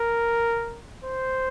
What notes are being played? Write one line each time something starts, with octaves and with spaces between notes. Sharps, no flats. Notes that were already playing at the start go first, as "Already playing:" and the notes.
Already playing: A#4
C5